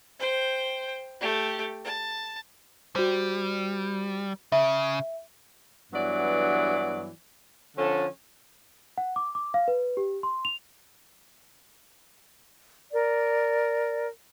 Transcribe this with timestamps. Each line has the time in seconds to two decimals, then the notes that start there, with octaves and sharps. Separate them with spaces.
0.19 C5 G5
1.20 A3 G4
1.84 A5
2.96 G3 F#4 C5
4.52 C#3 E5
5.92 G2 E3 F#3 B3 D5
7.77 D3 F3 C#4 A4
8.98 F#5
9.16 D6
9.35 D6
9.54 F5
9.68 B4
9.97 G4
10.23 C6
10.45 F7
12.91 A#4 D5